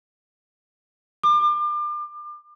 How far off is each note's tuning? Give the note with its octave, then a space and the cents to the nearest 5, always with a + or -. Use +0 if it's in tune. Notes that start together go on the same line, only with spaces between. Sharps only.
D6 +35